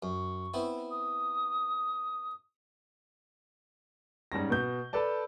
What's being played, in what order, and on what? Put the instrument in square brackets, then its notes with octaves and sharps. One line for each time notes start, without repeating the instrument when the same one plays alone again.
[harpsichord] F#2 [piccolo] C#6
[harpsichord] B3 C4 E4
[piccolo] D#6
[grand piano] G#2 G3 C#4 A#6
B2 G6
A4 B4 D5 A5